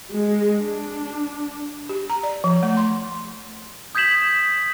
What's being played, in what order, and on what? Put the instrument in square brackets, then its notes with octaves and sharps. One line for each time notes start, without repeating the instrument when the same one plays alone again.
[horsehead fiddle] G#3
D4
[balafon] G4
A#5
D5
F3
A3
C6
[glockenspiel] D#6 G6 G#6 B6 E7 F#7